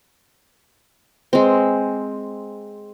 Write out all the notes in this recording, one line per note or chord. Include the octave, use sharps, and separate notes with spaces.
G#3 C4